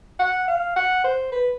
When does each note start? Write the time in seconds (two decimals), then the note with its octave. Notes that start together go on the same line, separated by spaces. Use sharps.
0.19 F#5
0.48 F5
0.76 F#5
1.04 C5
1.32 B4